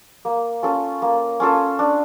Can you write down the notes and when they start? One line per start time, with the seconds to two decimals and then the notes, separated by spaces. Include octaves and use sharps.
0.25 A#3
0.63 C#4 F4 A4
1.02 A#3
1.40 C#4 F4 A4
1.79 D4